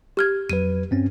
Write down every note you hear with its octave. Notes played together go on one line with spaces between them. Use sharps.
G4 F6 G#6
F2 F#3 B4 D#7
G2 C4 C#4